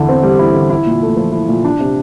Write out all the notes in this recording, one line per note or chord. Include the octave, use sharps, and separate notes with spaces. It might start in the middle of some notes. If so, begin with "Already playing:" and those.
Already playing: E2 D3 E4
C4
G3
E4
D3
E4
A#2
A3
F3
E4
A#2
D4
C3